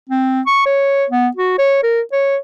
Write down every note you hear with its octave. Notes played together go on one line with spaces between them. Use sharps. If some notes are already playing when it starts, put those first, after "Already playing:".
C4
C#6
C#5
B3
F#4
C#5
A#4
C#5